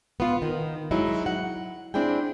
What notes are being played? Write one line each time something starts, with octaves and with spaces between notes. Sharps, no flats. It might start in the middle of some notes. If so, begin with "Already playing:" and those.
B3 F4
D#3
F#3 G#3 D#4 E4
F#5
C4 D4 E4 G#4 G5